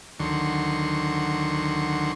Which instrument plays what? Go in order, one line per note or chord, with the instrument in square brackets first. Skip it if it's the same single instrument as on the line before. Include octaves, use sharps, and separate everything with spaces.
[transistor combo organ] D2 D3 D#3 F#3 C6 C#6